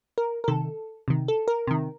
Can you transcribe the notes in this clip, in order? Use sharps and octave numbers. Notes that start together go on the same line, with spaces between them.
A#4
A#4
C3 D#3 A4
C3 D#3
A4
A#4
C3 D#3